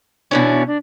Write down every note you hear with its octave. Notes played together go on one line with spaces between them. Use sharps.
B2 E3 C#4 D4
D4